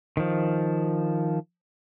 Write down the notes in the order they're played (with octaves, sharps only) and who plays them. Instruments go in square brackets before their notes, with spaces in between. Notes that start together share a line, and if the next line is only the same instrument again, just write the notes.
[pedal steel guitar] D#3 F3